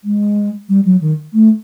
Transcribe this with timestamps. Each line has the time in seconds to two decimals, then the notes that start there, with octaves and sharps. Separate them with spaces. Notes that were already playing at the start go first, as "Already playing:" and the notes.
0.04 G#3
0.69 G3
0.85 F#3
1.01 D#3
1.33 A3